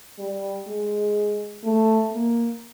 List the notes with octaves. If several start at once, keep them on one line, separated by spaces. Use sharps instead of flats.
G3
G#3
A3
A#3